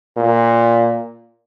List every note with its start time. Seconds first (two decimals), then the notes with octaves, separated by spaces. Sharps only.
0.17 A#2